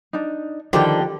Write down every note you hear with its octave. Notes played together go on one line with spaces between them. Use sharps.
D4 D#4
D3 D#3 F3 G3 D4 G4 G5